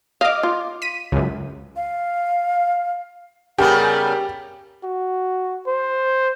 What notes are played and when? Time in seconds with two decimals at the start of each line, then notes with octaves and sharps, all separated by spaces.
0.21 D#5 F5 D6
0.43 F4
0.82 B6 D#7
1.12 C#2 F#2
1.76 F5
3.59 C#3 G3 B3 G4 A#4
4.84 F#4
5.67 C5